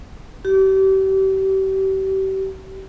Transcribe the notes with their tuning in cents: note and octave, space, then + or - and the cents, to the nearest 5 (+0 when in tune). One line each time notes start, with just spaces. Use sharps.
G4 -35